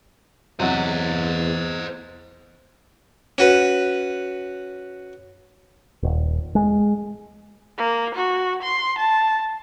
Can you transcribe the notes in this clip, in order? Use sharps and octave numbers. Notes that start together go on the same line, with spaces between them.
E2 C3 F#3 C5 D#5
C#4 F#4 B4
D#1
G#3
A#3
F#4
C6
A5